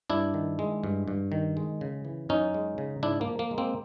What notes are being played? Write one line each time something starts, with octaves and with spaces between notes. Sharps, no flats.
G2 D4 E4
D#3
G#3
G2
G2
D#3
G#3
C#3
E3
F#2 C#4 D#4
G#3
C#3
G#2 D4 E4
A#3
F3
A#3
G#3
A#3 C4